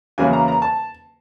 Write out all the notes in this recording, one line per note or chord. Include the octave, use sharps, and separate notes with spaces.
E2 C#3 F#3 A#3 G#5
A#5
A#5
A5